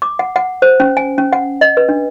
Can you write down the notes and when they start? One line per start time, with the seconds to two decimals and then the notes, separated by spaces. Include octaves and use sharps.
0.02 D6
0.19 F#5
0.36 F#5
0.62 C5
0.80 C#4
0.97 G#5
1.18 C#4
1.33 F#5
1.61 D#5
1.77 B4
1.89 D4